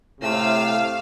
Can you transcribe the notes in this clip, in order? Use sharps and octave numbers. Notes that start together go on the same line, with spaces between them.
A2 C3 A3 F5 E6